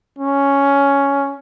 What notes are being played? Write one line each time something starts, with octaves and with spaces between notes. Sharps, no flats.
C#4